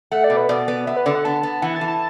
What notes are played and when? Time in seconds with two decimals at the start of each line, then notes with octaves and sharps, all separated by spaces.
0.11 A3 F#5
0.24 D5
0.30 B2
0.37 B4
0.49 B2 D5
0.68 B3
0.87 B3 E5
0.97 B4
1.06 D3 D5
1.15 F#5
1.25 B3 A5
1.43 B3
1.62 E3 F#5
1.76 A5
1.81 E3
1.88 A5